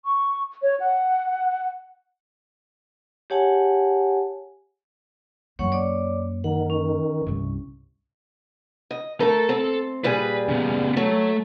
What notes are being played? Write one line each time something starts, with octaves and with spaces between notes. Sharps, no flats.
C#6
C#5
F#5
G4 G#4 C#5 F#5 G#5 A5
F#2 A#3 C#5 F#5 C#6
C#5 D5 D6
D#3 F#5
C#4
C2 G2
D#5
A3 A4 A#4 A5
C4
A#2 G3 G#4 B4
C#3 B3
F#3 A3